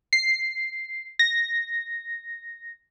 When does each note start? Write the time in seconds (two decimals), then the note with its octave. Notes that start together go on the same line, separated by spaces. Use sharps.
0.13 C7
1.19 A#6